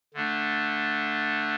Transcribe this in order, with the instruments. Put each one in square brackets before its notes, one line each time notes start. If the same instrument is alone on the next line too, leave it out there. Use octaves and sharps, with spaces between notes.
[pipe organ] D3 A3 D4